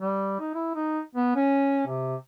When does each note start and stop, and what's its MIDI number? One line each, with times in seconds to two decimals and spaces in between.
0.01 0.38 55
0.40 0.53 63
0.55 0.71 64
0.75 1.00 63
1.15 1.32 59
1.36 1.86 61
1.87 2.16 48